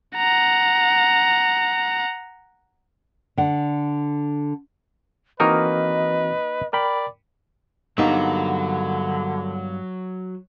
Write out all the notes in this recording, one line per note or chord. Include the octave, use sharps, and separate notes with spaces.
F#5 A#5
D3 F#5
E3 A#3 C4 D#4 F#4 A#4 B4 D#5
A#4 D5 G5 B5
G2 D3 F#3 A#3 B3 D#4 E4